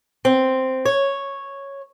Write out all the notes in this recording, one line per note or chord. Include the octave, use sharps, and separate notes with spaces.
C4
C#5